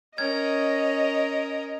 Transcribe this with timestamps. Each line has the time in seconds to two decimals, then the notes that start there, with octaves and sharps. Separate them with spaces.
0.18 C#4 A#4 D#5 F6 G#6